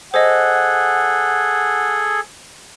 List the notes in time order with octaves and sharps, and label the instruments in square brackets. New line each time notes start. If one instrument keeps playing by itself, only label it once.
[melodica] G#4 A4 [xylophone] C5 D#5 [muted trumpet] F#5